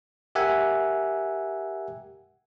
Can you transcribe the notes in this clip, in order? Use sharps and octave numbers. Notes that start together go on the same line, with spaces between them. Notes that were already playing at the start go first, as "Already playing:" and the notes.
G4 A#4 E5 F#5 G#5